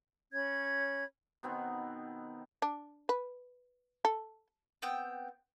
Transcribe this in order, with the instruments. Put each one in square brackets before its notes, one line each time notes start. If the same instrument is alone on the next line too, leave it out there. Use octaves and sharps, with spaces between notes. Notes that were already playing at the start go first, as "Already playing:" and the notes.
[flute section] C#4 C#5 B5 G#6
[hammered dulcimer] B2 D#3 B3 C4
[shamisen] D4
B4
A4
[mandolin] B3 C4 G5